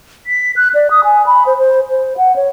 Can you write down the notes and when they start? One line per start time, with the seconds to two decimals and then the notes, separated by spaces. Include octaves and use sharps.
0.26 B6
0.56 F#6
0.74 D5
0.90 D#6
1.04 G#5
1.26 B5
1.46 C5
1.58 C5
1.90 C5
2.17 F#5
2.36 C#5